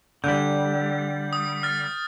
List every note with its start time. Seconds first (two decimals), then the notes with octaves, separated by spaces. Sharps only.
0.24 D3 G3 G6
1.33 D#6
1.63 F6 A6